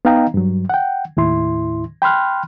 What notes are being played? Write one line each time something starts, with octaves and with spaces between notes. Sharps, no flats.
B3 D#4 D#5 F5 G5 A#5
G2 F#3
F#5 G5
D#2 A2 E4 C6
G5 B5 C6 F6 F#6